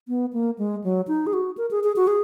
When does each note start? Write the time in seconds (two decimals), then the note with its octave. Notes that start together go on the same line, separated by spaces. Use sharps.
0.08 B3
0.33 A#3
0.58 G#3
0.84 F#3
1.08 D#4
1.27 G#4
1.33 F#4
1.58 A#4
1.71 G#4
1.84 G#4
1.96 F#4
2.07 G#4